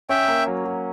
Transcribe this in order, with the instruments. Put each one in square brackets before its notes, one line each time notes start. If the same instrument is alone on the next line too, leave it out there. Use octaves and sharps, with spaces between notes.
[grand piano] C#4 [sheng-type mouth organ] E5 G5
[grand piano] A#3
F#3
F#3